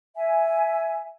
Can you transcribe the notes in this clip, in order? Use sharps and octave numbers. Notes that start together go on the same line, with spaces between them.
E5 G#5